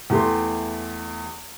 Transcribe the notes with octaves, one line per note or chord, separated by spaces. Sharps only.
E2 A3 G4 C6